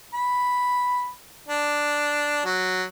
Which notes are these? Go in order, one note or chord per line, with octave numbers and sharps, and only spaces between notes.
B5
D4
F#3